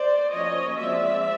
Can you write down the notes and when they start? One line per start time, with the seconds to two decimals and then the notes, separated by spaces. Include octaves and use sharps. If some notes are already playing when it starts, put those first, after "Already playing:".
Already playing: C5 D5
0.32 F3 A#3 C#4 C#5 D#5
0.78 F3 G#3 C4 D5 E5